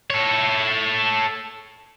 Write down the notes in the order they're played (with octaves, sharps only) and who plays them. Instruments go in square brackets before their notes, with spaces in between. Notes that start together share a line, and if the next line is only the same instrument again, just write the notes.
[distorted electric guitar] A4 C#5